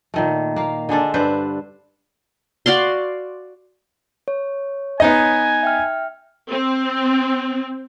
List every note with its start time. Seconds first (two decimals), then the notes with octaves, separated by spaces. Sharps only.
0.14 A#2 D#3 A3
0.56 A#3 F5
0.89 D3 G#3 D4 A4
1.14 G2 D4 B4 C5
2.66 F#4 D5 F5 C6
4.28 C#5
5.00 B3 D#4 D#5 G#5
5.63 E5 G5 F6
6.50 C4